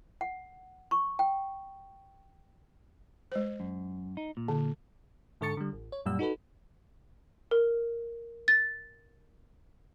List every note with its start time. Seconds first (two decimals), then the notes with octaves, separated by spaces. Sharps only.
0.21 F#5
0.91 C#6
1.19 G5
3.32 G#3 C5
3.60 F#2
4.17 D#4
4.37 A#2
4.48 D3
5.41 G#2 D3 A4 C#6 A6 C#7
5.57 D3 G3
5.73 A1
5.92 C#5
6.06 F#2 A#2 G3 E6
6.19 D#4 F#4 A4 B4
7.51 A#4
8.48 A6